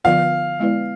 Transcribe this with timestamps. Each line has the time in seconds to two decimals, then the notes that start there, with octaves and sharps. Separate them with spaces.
0.04 D3 F3 B3 F4 B4 F5
0.60 G#3 B3 E4 B4 D5